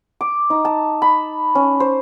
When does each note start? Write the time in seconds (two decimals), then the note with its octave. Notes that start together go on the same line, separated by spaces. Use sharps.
0.21 D6
0.50 D#4
0.65 A5
1.02 B5
1.55 C#4
1.80 C5